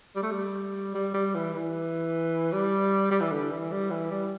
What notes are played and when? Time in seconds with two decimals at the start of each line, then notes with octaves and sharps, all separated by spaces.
0.16 G3
0.23 A3
0.31 G3
0.95 G3
1.14 G3
1.34 E3
1.54 E3
2.52 G3
3.11 G3
3.20 E3
3.32 D3
3.51 E3
3.72 G3
3.90 E3
4.11 G3